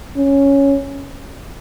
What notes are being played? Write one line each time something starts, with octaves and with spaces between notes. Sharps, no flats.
C#4